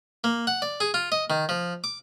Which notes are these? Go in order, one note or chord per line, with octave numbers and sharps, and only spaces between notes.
A#3
F#5
D5
G#4
F4
D#5
D#3
F3
D6